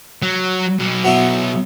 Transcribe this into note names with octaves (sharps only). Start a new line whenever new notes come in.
F#3
B1 B2
F#3 B3 E4